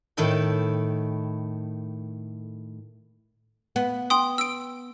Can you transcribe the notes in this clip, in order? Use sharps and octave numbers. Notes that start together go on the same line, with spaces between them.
A2 D#3 E4 A4 G5
B3
G5 C6 D#6
E6 D7